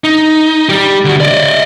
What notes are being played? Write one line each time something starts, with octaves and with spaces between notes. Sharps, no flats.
D#4
G3 G4
D3 F#4
D5 D#5